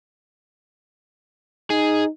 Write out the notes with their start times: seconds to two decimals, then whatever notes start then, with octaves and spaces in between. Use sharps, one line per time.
1.70 D#4 G#4